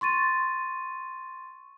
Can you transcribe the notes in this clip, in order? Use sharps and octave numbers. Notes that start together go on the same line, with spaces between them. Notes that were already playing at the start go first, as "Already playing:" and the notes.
C6 C#6 A6 D#7